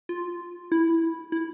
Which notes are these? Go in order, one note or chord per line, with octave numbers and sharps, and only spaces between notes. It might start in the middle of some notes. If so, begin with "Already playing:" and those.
F4
E4
E4